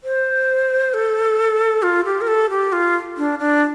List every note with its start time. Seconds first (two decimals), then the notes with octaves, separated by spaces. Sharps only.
0.04 C5
0.94 A4
1.83 F4
2.05 G4
2.21 A#4
2.27 A4
2.50 G4
2.72 F4
3.17 D4
3.39 D4